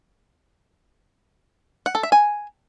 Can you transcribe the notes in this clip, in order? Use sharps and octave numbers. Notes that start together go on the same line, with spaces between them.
F#5
A4
E5
G#5